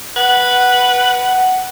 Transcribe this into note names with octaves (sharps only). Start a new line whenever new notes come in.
B4 F#5